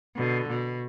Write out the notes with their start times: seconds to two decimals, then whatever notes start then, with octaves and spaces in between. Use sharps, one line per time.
0.16 B2 D3
0.48 B2